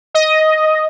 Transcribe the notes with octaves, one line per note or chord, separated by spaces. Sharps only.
D#5